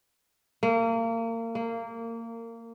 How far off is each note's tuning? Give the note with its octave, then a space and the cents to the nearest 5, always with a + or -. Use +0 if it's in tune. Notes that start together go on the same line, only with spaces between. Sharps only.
A#3 -30
A#3 -20